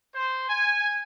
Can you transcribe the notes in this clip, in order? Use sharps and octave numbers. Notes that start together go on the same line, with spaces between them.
C5
G#5